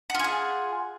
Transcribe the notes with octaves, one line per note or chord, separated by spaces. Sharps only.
F4 G#4 F#5 G#5